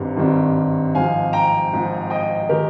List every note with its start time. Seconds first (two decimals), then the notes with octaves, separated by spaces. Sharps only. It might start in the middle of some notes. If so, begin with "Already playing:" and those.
Already playing: G#1 G2 D#3 G3 C4
0.17 G#1 G2 D#3 G3 C4
0.95 G#1 G#2 F3 F5 G#5
1.33 G5 A#5
1.73 G#1 G#2 F3
2.10 D#5 G5
2.49 D#3 G#3 G4 A#4